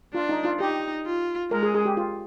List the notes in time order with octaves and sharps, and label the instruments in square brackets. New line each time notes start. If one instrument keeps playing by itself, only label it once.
[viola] D4 [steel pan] F4
[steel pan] D#4
F4
[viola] D#4 [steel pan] G4
[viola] F4
[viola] G#3 [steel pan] A#4
[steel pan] G#4
G#4
G4
F4